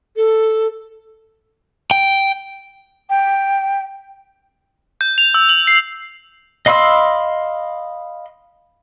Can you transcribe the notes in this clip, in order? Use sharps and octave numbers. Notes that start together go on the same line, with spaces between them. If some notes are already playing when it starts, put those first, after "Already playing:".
A4
G5
G5
G6
F7
E6
F#7
C7
D#5 F5 B5 C6 E6